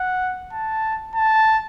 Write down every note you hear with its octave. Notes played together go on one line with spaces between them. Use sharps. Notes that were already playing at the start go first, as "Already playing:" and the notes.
Already playing: F#5
A5
A5